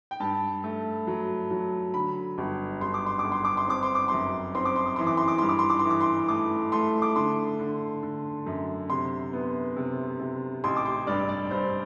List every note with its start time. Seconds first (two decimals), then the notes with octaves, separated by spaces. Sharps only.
0.11 G5
0.20 G2 A5
0.64 A3
1.07 F#3
1.50 F#3
1.94 D3 B5
2.38 G1
2.81 G1 C6
2.94 D6
3.06 C6
3.19 D6
3.24 G1
3.32 C6
3.45 D6
3.57 C6
3.68 C4 D6
3.83 C6
3.95 D6
4.08 F#2 C6
4.55 C4 C6
4.65 D6
4.76 C6
4.86 D6
4.96 E3 C6
5.07 D6
5.17 C6
5.28 D6
5.38 G2 C6
5.49 D6
5.59 C6
5.70 D6
5.79 C6
5.85 E3
5.90 D6
6.01 C6
6.28 A3 D6
6.72 A3 C6
7.02 D6
7.16 D3 C6
7.59 D3
8.03 D3
8.46 F#2
8.90 C3 C6
9.33 B3
9.77 C3
10.20 C3
10.64 A1 C6
10.77 D6
10.86 C6
11.07 G2 D5
11.29 D5
11.51 G2 C5